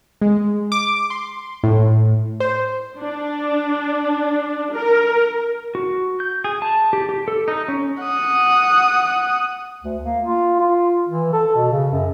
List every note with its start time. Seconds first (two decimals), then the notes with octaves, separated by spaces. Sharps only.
0.21 G#3
0.72 D6
1.10 C6
1.63 A2
2.40 C5
2.98 D4
4.74 A#4
5.75 F#4
6.20 G6
6.44 G#4
6.62 A5
6.93 G4
7.09 G4
7.28 A4
7.48 D#4
7.68 C#4
8.03 F#5 D#6
9.83 D2
10.03 A#3
10.24 F4
10.60 F4
11.09 E3
11.33 A4
11.55 B2
11.72 C#3
11.92 F#2